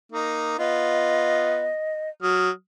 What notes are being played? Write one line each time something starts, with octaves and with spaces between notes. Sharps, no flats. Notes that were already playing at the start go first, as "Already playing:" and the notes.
A#3 D#4
B3 F4 D#5
F#3 D#6 F6